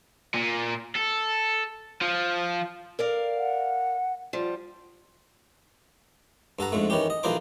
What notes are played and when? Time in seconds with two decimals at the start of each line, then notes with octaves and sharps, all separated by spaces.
0.34 A#2
0.95 A4
2.01 F3
2.99 A#4 D5 F5
3.37 F#5
4.33 F3 G3
6.59 G2 A4 F#5 A#5
6.72 F2 G#2 D3 A3
6.90 D#3 E3 C#4 G4
7.10 D#5
7.23 B1 E3 F3 A#4 C5 D6